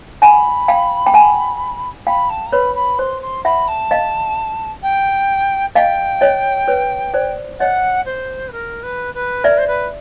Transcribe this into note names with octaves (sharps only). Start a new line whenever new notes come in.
F#5 G#5 B5
F5 G5
G5
F#5 G#5
F5 G5 B5
A5
A#5
B4 C#5 B5
B5
C5 C6
C6
E5 F#5 B5
A5
D#5 F5
G5
D#5 F5 G5
C#5 D#5
B4 C#5
C5 D5
C#5 D#5 F#5
C5
B4
A#4
B4
B4
A#4 D5 E5
C5
B4